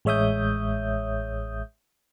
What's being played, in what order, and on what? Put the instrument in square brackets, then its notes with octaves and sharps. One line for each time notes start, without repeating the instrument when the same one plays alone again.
[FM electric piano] A1 G#3 C#5 E5 D#6 G6